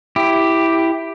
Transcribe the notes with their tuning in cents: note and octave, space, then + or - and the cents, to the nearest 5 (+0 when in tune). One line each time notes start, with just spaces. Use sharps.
E4 +0 G4 +0